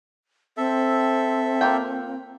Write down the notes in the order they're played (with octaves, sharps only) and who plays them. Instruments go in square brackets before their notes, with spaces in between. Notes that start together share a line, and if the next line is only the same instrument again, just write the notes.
[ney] C4 [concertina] A4 E5
[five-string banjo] A#3 F4 G5